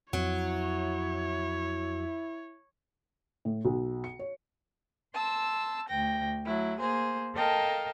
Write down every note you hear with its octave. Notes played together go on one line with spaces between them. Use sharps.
F2 F#3 E4 C#5
A2
B1
C#7
C#5
A5 C6 E6
D2 G5 A#6
F#3 A3 E4
A#3 G#4 C5
A4 A#4 D#5 F5 G5 A5